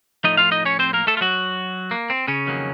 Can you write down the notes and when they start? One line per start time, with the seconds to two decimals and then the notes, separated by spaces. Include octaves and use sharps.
0.24 A2 F3 A3 D#4 D#5
0.37 F4 F5
0.51 D#4 D#5
0.65 C#4 C#5
0.79 C4 C5
0.93 A#3 A#4
1.07 A3 A4
1.17 F4
1.21 F#3 F#4
1.91 A#3
2.10 C4
2.28 C#3 C#4
2.46 F2 D#3 F#3 A#3